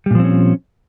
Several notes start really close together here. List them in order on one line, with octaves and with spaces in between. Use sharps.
G3 A#2 F3 C4 C#4